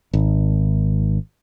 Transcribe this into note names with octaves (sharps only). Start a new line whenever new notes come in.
G#1